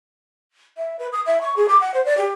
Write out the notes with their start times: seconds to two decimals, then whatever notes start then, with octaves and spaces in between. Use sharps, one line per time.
0.77 E5
0.99 B4
1.12 D#6
1.26 E5
1.41 C#6
1.56 G#4
1.68 D6
1.81 F#5
1.94 C5
2.05 D5
2.17 G4